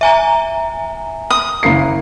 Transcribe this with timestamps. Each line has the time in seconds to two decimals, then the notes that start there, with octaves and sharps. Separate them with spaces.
0.01 E5 G#5 A#5
1.30 D#6
1.63 F#1 A#3 C7